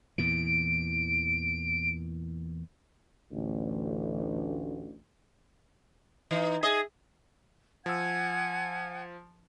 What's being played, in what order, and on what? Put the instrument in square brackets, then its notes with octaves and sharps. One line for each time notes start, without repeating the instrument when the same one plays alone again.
[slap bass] E2 A#2 E3 [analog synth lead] D7
[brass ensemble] A1 D2
[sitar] E3 D#4
G#4 D#5 E5
[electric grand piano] F3 E6 [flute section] F#5 G#5 G#6